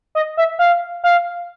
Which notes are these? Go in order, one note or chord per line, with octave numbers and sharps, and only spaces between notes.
D#5
E5
F5
F5